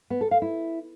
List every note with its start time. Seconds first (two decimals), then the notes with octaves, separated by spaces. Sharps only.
0.10 B3
0.21 A4
0.31 F5
0.42 E4